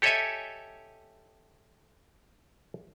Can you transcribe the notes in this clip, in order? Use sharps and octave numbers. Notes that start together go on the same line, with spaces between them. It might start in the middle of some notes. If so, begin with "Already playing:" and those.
G4 A4 C#5 D#5 E5 G#5